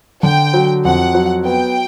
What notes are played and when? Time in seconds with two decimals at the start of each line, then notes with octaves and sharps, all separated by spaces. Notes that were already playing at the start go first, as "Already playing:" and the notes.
0.23 D3 G5
0.54 F#3
0.85 F2 F#5
1.15 F#3
1.45 B3 G5